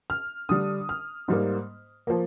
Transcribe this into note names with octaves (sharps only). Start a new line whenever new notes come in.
F6
D3 G3 D4 D#6
F6
G#2 G3 A#3
F3 A#3